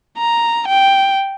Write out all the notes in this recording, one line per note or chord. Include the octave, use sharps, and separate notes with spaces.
A#5
G5